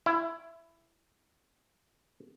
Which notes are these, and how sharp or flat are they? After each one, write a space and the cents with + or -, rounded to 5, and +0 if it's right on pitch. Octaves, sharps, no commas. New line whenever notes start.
E4 +15